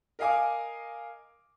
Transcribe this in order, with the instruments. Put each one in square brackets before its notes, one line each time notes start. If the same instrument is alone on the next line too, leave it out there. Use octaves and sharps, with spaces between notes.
[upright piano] A#4 D#5 F5 G#5 D6